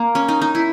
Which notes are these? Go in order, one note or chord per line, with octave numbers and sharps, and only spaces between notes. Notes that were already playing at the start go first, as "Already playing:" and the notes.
Already playing: A#3
C#4
D#4
D#4
E4